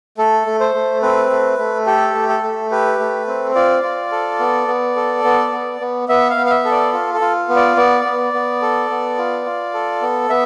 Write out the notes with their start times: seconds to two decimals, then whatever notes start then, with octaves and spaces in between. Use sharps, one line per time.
0.18 A3 A4
0.47 A3
0.60 C5
0.74 A3
1.02 C4 B4
1.30 A3
1.59 A3
1.86 G4 A4
2.15 A3
2.29 A4
2.43 A3
2.71 G4 B4
2.99 A3
3.27 C4
3.55 F4 D5
3.83 F4
4.12 A4
4.39 B3
4.68 B3
4.96 A4
5.24 B3
5.52 B3
5.81 B3
6.09 B3 E5
6.30 F5
6.37 B3
6.46 F5
6.51 E5
6.65 A4
6.71 D5
6.93 F4
7.14 A4
7.21 F4
7.49 B3
7.56 D5
7.77 B3 D5
8.05 B3
8.33 B3
8.62 A4
8.90 B3
9.18 F4
9.46 F4
9.74 A4
10.02 B3
10.29 B3 E5